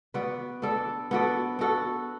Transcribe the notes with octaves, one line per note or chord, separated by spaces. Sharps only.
B3 F#4 B4 D5
B3 D4 A4 D5
B3 F#4 A4 D5
B3 F#4 A4